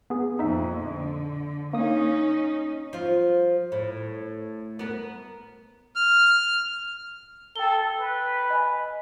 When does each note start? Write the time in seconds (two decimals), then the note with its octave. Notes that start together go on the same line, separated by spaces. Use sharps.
0.10 B3 G#4
0.39 F2 A#2 D#4 E5
0.85 D3
1.73 A#3 C#4 D#4 D#6
2.93 F3 F4
3.72 A2
4.79 B3 A#4
5.96 F6
7.56 A4 G5 G7
7.97 B4
8.50 D#5 G#5 B5